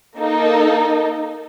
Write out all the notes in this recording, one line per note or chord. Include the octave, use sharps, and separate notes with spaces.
A#3 D#4 A4